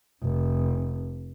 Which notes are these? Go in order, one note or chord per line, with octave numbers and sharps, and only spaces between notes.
F1